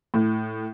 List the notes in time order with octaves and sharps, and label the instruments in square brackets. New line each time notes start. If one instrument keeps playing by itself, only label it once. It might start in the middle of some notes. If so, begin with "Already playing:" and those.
[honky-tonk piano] A2